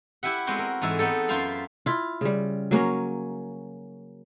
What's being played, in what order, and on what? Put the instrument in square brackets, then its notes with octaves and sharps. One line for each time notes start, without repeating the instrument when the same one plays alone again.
[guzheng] E4 G4 B4 E5 F#5
G#3 B3 C4 F#4 C5
A#4
G#2 E3 G#3 A4 E5
B3 C4 D#4 A4
F#2 F4 C5 E5 F5 B5
[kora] E4 F4
C#3 G3
F#3 A#3 C#4